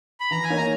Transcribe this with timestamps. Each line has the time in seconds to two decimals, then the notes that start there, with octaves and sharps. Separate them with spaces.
0.20 B5
0.31 E3 A#5
0.44 G#5
0.50 A#3 D#4 A#4 C#5
0.57 A#5